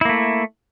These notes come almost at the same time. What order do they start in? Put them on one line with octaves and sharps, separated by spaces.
E4 A#3 A3